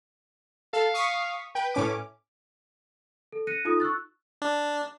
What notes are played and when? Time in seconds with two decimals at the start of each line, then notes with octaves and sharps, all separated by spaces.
0.73 A4 F5
0.94 C#6 D#6 B6
1.55 B4 G5
1.74 A2 C#4 D6
3.32 A4
3.47 F#6 A#6 C#7 D#7
3.65 D#4 F4 A4 D#6
3.80 C#6 E6 F#6 A6
4.42 D4